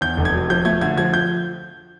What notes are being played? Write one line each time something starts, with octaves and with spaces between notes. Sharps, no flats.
E2 G6
F1
G#6
F#3
F3 G6
A3 G#6
D3 G#6
F3 G#6
G6